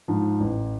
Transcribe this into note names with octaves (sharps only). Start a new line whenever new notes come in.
G#2 F3
A1